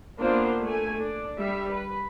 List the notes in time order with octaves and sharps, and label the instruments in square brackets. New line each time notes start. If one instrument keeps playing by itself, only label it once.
[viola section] A#3 B3 D4 F4 C5
A3 G#5
D4
G3 E5
B4